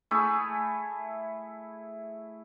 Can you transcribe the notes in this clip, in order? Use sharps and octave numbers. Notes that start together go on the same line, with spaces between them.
A3 E4 G#4